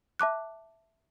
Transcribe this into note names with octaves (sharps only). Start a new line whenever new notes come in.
E5 A5 D6 F#6